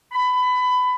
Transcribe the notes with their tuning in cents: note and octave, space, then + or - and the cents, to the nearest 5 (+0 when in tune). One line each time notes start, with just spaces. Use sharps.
B5 +20